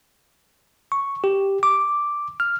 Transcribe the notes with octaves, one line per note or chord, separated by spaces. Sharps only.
C#6
G4
D6
F6